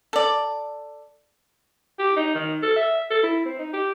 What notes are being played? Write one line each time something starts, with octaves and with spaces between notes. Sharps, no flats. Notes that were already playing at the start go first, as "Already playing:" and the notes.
A4 D5
G4
D#4
D#3
A4
E5
A4
E4
C4
D#4
G4